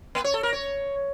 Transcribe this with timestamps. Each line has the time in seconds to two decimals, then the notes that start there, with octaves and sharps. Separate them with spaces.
0.15 A#3
0.24 C#5
0.34 A4
0.43 A#4
0.53 C#5